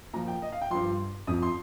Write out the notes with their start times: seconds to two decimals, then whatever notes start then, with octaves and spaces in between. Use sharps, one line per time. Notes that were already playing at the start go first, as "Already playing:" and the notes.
0.14 A#2 F3 A#5
0.28 G5
0.42 D#5
0.52 F5
0.62 G5
0.70 G2 F3 C6
1.27 F2 F3 D#6
1.42 C6